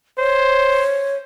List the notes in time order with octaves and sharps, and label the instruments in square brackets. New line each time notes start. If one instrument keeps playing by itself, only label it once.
[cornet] C5 [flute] C#5